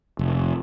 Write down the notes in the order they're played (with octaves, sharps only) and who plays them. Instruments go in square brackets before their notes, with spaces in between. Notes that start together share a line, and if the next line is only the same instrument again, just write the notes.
[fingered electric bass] F1